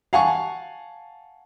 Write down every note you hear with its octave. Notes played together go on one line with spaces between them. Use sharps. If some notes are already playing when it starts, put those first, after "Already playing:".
F5 F#5 G#5 A5 C#6